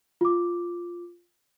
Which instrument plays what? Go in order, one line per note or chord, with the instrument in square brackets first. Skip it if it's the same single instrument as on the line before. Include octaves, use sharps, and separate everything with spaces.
[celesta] F4 D6